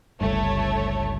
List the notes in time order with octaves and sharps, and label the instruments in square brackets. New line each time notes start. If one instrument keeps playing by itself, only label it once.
[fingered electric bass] G1 C#2 G2 [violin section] A3 C#5